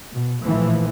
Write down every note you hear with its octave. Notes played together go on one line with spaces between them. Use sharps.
B2
A#1 A2 E3 F3